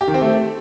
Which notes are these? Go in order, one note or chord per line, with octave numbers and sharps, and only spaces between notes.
G4
D#3
C4
A3